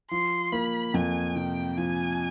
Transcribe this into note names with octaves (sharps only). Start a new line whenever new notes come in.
F3 C6
A#3 B5
F2 G#5
C3 G5
F3 G#5